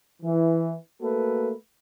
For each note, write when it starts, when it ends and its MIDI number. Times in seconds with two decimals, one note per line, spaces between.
0.23 0.75 52
1.02 1.53 57
1.02 1.53 58
1.02 1.53 66
1.02 1.53 69
1.02 1.53 71